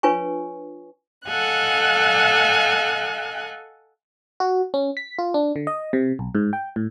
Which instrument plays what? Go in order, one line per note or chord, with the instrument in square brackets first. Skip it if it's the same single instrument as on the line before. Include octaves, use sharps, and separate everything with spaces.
[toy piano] D4 F4 B4 C#5 G#5 C#6
[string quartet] A4 D#5 F5 F#5 G#5 F#6
[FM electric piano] F#4
C#4
B6
F4
D4
D3
D#5
C3
B1
G#2
G5
A2